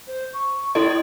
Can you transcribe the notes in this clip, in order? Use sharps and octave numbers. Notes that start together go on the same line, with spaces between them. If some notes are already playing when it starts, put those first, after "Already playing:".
C5
C#6
E4 A4 D#5 C6